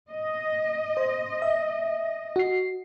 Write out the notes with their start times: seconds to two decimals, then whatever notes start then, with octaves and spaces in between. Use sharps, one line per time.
0.11 D#5
0.97 C5
1.42 E5
2.36 F#4 C7